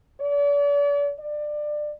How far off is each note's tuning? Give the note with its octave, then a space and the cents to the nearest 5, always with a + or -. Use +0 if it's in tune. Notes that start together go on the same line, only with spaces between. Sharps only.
D5 -40
D5 +20